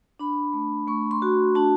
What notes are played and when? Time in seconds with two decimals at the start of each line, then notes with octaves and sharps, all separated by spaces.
0.19 D4 B5
0.53 A3
0.88 A3 C#6
1.11 C6
1.22 F#4
1.55 D4 A5